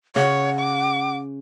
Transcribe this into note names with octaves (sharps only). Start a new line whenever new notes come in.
C#3 C#5 F#5
D6